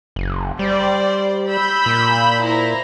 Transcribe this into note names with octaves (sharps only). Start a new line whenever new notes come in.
F#1
G3 C5 D5
B5 E6 G6
A#2
E4 C5 A#5